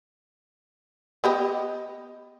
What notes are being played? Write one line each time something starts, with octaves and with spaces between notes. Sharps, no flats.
B3 G4 D#5